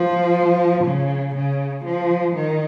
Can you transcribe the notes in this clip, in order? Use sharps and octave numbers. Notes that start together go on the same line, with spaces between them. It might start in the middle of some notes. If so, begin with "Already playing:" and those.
Already playing: F3
C#3
C#3
F3
D#3